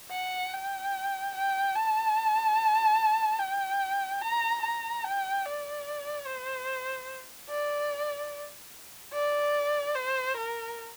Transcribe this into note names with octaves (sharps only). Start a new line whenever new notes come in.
F#5
G5
G5
A5
G5
A#5
A#5
G5
D5
C5
D5
D5
C5
A#4